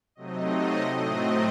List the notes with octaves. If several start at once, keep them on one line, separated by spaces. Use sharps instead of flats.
C3 F#3 A3 C4 D#4 D#5
A2 F#3 A3 C4 D#5